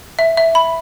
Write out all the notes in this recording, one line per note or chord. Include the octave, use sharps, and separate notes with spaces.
E5
E5
B5